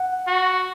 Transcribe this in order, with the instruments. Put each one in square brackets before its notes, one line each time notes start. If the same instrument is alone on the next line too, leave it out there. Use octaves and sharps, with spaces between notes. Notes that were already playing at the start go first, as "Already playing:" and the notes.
Already playing: [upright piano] F#5
[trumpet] F#4